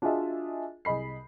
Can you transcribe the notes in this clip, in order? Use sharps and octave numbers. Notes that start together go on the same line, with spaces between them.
D4 F4 F#4 G#4 D#5 E5
C2 G#4 D#5 B5 C7